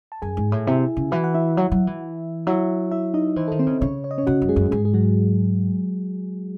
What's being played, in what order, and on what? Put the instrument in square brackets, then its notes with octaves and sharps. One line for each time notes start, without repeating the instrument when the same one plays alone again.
[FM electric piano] A5
[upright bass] F#2 [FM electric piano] G#4 G#5
[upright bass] G#2
A2
[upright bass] C3 [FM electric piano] E4 E5
[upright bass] C#3
[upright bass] E3 [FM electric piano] F#4 F#5
[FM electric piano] F#5
E4 E5
[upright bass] F#3
F#3
E3
[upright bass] F#3 [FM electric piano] E4 E5
[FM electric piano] E4 E5
D#4 D#5
[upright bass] E3 [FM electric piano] C5
[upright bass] D#3 [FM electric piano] A4
[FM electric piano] C4 C5
[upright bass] C#3
[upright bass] C#3 [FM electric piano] C#4 C#5
[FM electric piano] C#5
D#5
C#4 C#5
[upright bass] C#3 [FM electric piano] F#4 F#5
[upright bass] F#2
[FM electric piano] G#3 G#4
[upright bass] F#2
[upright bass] G#2 [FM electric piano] G#3 G#4
[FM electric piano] G#4
F#3 F#4